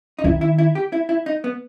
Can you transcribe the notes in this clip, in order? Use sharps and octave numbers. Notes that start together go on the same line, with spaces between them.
D#4
D#3 E4
E4
E4
G4
E4
E4
D#4
B3